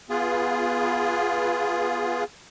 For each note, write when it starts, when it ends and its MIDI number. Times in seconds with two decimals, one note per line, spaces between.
0.10 2.24 59
0.10 2.24 65
0.10 2.24 68